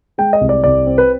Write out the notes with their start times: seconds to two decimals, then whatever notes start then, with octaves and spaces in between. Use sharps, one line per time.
0.18 G#3 G5
0.33 D#5
0.41 C2
0.49 D5
0.64 C2 D5
0.86 C4
0.98 B4